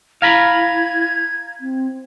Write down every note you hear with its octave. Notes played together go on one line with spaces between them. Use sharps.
E4 F5 A#5 B5 G#6
C4